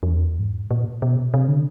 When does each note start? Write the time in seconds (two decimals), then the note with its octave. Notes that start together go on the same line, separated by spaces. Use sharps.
0.03 F2
0.09 E2
0.39 G#2
0.71 A#2
1.02 B2
1.34 C3
1.48 D3